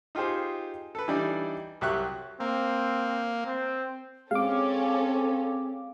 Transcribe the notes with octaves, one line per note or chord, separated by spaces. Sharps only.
D#4 F4 G4 G#4 C5
A4 B4
E3 G3 D4 D#4 D5
C2 F#3 G4 E5 C#6 F#6
A#3 C4
C4
G#3 C4 C#4 A4 F5 D6